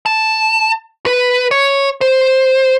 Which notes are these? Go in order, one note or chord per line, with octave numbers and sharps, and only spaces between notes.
A5
B4
C#5
C5